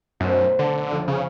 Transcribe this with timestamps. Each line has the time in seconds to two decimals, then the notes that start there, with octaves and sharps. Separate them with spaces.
0.20 B1 F#2 A3 C5
0.59 D3 A4
0.91 F1 F4
1.08 C#3 G#4 F5